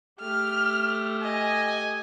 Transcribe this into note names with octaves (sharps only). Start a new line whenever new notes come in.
A3 G4 F6
D#5 G#5